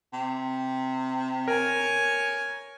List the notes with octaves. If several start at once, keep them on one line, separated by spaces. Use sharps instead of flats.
C3
A#4 C#5 G#5